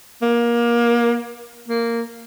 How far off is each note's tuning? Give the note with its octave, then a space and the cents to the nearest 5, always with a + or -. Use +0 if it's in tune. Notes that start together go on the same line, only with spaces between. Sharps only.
A#3 +25
A#3 -10